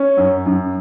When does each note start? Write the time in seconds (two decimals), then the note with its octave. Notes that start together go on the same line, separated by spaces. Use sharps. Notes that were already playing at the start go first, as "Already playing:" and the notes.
Already playing: C#4
0.17 F#2
0.46 F#2